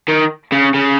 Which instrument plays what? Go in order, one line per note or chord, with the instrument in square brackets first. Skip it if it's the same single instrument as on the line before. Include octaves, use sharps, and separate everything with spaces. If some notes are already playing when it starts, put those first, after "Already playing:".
[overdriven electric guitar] D#3
C#3
C#3